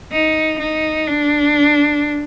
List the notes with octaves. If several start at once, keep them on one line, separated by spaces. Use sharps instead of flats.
D#4
D#4
D4